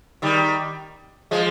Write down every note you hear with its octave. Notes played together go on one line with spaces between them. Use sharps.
D#3 G3
F3 G#3